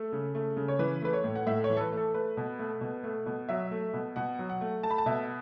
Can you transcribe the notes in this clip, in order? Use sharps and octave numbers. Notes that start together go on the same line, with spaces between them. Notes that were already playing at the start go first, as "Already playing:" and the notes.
Already playing: A3 A4
C#3
A3
C#3
C#5
E3 B4
A3 B4
C#5
A2
F#5
A2 E5
C#5
E3
A4
B4
A3
A4
A3 B4
B2
A3
B2
A3
B2
F#3 E5
A3
B2
B2 F#5
F#3
F#5
A3
A3 A5
B5
A5
B2 E5